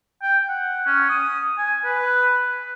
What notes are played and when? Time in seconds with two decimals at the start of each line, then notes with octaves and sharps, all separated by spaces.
0.23 G5
0.49 F#5
0.86 C#4
1.09 D#6
1.58 G#5
1.85 B4